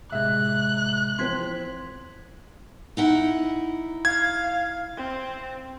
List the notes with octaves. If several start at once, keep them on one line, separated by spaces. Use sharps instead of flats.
A2 C3 G#3 E5 F#6
E3 F3 C4 C6 G#6 B6
D#4 E4 F#5
F5 G#6
C4